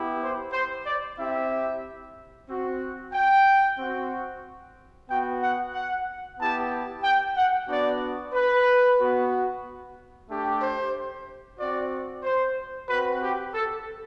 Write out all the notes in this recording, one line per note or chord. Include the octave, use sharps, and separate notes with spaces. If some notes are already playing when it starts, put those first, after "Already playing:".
Already playing: B3 E4 G4
C5
C5
D5
C4 E4 G4 E5
C4 F#4
G5
C4 F#4
B3 F#4 G5
F#5
F#5
B3 E4 G4 A5
G5
F#5
B3 D4 F#4 D5
B4
B3 F#4
A3 D4 G4
C5
C4 F#4 D5
C5
C4 F#4 B4
G4
A4